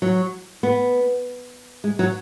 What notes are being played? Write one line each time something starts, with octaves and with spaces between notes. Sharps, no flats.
F#3
B3
G#3
F#3